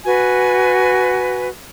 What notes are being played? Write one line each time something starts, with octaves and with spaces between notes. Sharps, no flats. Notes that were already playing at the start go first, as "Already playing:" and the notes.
F#4 B4 G#5